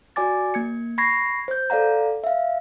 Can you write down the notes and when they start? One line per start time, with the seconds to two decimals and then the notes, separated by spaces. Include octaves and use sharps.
0.16 F#4 D5 G#5 D6 A6
0.54 A#3 G#6 C#7
0.98 B5 C#6 G#6 A#6 C7
1.48 C5 G6
1.70 A4 D5 F5 F#5 A#5
2.24 E5 F5